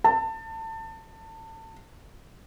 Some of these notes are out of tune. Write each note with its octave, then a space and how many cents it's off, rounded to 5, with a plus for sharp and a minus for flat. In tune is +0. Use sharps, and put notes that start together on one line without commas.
A5 +25